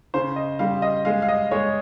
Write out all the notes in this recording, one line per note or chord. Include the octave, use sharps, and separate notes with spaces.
C#3 C5
D#5
G3 F5
D#5
G#3 F5
F5
D#5
G#3 C#5